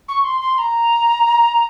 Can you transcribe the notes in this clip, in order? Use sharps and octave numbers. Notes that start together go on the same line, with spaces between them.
C#6
C6
C6
A#5